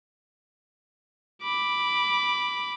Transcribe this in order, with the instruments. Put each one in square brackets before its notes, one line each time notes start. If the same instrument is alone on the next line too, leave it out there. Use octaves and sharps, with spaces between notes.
[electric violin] B5 D6